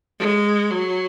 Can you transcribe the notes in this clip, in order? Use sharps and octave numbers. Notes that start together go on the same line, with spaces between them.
G#3
F#3